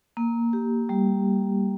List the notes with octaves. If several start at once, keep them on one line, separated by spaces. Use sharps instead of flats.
A#3
G4
G3